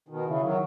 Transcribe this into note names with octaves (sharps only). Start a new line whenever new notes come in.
B2 D#3
C#3 E3
D#3 F#3